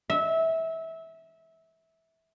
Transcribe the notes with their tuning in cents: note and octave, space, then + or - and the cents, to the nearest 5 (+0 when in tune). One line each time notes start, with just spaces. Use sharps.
E5 -20